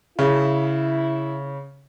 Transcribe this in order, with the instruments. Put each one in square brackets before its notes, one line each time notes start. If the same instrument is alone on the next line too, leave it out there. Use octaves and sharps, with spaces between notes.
[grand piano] C#3 [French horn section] E4